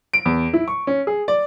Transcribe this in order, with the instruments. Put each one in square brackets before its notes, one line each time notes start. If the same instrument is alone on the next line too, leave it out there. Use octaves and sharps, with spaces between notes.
[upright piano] D7
E2
E4
C#6
C#4
G#4
D5